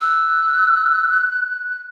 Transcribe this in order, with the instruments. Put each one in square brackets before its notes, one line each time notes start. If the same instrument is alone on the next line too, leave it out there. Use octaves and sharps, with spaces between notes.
[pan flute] E6 [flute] F#6